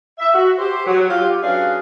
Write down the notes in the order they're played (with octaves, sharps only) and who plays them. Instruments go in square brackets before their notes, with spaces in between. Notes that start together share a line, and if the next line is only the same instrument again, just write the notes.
[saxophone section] E5
F#4
G4 C5
F#3
F4 G4
F#3 C#4 D4 G#4 B4 F5